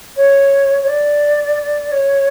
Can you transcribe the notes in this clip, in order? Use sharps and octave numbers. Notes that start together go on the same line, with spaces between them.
C#5
C#5
D5
C#5